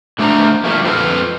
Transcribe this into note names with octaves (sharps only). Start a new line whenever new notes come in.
D3 A3 D4 C5 A#5
F3 G3 A3 A#3
F2 G#3 C4 F4 A4 B4